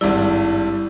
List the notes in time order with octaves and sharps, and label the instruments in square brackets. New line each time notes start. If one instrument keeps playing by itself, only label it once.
[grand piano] G#1 G2 G3 [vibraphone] E4